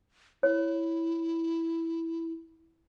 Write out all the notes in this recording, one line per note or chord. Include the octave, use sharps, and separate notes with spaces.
E4 C#5